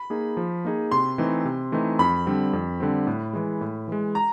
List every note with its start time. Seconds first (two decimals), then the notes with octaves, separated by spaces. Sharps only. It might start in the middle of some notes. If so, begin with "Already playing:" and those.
Already playing: B5
0.10 A#3 D#4 G#4
0.37 F3
0.65 A#3 D#4 G#4
0.92 C3 C6
1.18 E3 A3 C4 D#4
1.45 C3
1.72 E3 A3 C4 D#4
1.99 F2 B5
2.26 D3 G3 C4
2.53 F2
2.80 D3 G3 C4
3.07 A2
3.33 E3 G#3
3.61 A2
3.88 E3 G#3
4.15 A#5